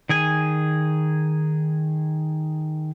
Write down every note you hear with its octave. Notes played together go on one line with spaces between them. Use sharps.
D#3 G#4 G#5